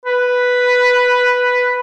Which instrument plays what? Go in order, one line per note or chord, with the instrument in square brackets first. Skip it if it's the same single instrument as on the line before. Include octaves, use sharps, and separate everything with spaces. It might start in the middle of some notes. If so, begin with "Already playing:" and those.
[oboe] B4